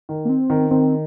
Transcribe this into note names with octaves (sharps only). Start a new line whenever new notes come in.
D#3
A#3
C4
D#3
D#3 C4